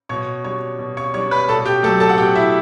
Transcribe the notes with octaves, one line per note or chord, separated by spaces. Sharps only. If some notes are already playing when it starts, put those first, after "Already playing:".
B2 C#5 C#6
G3 D4 C#5 C#6
B2
C#5 C#6
G3 D4 C#5 C#6
B4 B5
B2 A4 A5
G4 G5
F#3 A3 A4 A5
A4 A5
F#5
B2 G4 G5
E4 E5